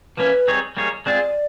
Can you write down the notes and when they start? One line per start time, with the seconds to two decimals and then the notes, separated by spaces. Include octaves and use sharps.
0.17 F3 A#3 C#4 E4 B4
0.48 G3 C4 D#4 G#4 C#5
0.77 G3 A#3 D#4 G#4 C#5
1.06 G#3 C4 F4 G#4 D5